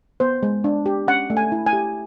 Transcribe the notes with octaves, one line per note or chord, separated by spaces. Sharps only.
B3 C5
G#3
D4
G4
C#4 F#5
A3
G#5
E4
G#5
G4